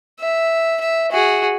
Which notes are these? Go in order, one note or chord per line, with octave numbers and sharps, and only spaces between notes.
E5
E5
F#4 G#4